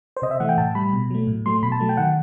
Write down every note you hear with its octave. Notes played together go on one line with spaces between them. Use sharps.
C5
C3 D#5
E5
E3 A3 F#5
G5
A2 A5
G3 B5
B2
F#3 A3
A2
F#3 A3 C6
B2 B5
A5
F#3 A3
G5
D#3 F#5